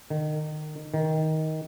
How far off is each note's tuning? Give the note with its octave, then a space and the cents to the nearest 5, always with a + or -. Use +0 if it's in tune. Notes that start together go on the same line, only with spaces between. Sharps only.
D#3 -25
D#3 +15